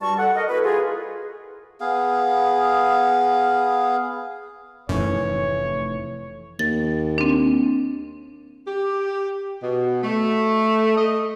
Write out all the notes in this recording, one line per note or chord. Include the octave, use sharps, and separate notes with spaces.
G2 G3 F#4 D5 A5 C#6
A4 F#5
A#4 D#5
A#3 E4 F#4 A4 B4
F4 G#4
B3 G#4 F5
F1 F#2 A2 E3 C#5
D#2 A6
C4 D4
G4
B2
A3
D#5